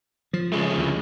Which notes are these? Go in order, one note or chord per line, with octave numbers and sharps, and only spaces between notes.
F3
C#3 G#3 A3
D2